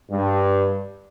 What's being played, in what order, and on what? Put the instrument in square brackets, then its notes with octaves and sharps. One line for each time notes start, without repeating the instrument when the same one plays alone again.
[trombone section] G2